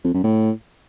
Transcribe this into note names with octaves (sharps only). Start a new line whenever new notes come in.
F2
F#2
A2